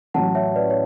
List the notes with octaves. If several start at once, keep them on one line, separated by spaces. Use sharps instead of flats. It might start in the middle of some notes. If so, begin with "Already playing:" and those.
A1 A2 F#3 F#5 A5
C#5 E5
B4 D5
C#5